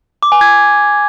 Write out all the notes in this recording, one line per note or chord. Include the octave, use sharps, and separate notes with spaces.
D6
G#5
G#6